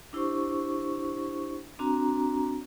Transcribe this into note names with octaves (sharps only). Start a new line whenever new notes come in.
D4 E4 G4 C5 C#6
C4 D4 F#4 A#5